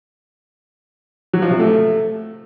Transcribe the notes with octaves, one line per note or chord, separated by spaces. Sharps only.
F#3
F3
C3
A3